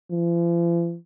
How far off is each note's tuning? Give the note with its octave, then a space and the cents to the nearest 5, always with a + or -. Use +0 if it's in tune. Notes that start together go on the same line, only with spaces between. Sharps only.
F3 -45